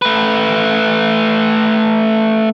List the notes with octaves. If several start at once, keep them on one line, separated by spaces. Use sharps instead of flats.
A3 B4